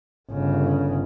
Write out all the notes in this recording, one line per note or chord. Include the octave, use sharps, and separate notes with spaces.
G1 C#3